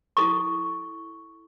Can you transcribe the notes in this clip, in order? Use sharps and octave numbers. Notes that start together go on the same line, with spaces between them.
E4 A4 C#6